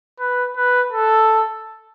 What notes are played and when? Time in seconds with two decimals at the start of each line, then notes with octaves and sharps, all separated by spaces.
0.19 B4
0.56 B4
0.92 A4